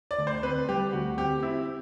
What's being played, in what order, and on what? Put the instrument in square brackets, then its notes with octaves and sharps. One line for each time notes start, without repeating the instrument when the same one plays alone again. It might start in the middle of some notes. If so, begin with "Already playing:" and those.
[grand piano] D5
[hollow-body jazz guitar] D2
[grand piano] C5
[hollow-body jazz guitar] C4 [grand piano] B4
[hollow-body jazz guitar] G3 [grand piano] G4
[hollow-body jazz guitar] D2 [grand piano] F#4
[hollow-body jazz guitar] C4 [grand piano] G4
[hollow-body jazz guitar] C4 [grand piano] E4